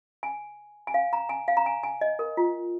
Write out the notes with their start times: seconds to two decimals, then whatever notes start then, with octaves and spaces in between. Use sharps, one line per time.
0.23 G#5
0.87 G#5
0.94 F5
1.13 A#5
1.29 G#5
1.48 F5
1.57 A#5
1.66 G#5
1.83 G#5
2.01 D#5
2.19 A#4
2.37 F4